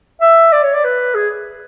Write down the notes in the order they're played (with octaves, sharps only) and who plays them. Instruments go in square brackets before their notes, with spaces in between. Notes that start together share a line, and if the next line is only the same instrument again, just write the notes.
[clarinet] E5
D5
C#5
D5
B4
G#4